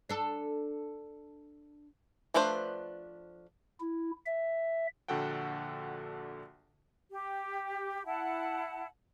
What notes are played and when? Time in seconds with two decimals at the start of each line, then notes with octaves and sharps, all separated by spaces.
0.09 D4 A4
2.34 F3 A3 D4 B4 C5
3.81 E4
4.26 E5
5.08 A#1 D3 F#4 A4 F#5 G5
7.11 G4
8.06 E4 F#5 A5